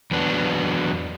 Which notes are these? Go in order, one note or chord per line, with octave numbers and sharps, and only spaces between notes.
E2 F#3 B3 D4